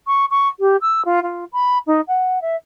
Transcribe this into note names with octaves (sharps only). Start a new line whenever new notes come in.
C#6
C#6
G4
E6
F4
F4
B5
D#4
F#5
E5